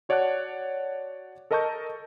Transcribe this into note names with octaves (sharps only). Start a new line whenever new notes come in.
F#4 C#5 D5 F#5 A5 F#6
A4 A#4 D#5 A5 C#6 G6